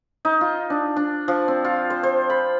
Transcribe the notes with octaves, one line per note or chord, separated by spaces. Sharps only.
D#4
F4
D4
D4
F3
C4
F4
C5
C5
B5